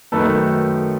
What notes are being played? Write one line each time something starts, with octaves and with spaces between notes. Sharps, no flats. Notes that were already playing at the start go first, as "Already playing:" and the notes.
F#2 D#3 F#3 A3 A4 B4